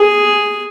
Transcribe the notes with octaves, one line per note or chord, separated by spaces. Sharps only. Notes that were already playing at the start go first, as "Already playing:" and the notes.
Already playing: G#4